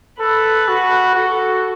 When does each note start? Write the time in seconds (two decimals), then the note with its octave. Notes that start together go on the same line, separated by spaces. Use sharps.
0.20 A4 B4
0.68 F#4
1.15 F#4 A4